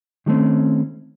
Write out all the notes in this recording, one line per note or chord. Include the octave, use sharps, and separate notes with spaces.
D#3 G3 A3 C4 C#4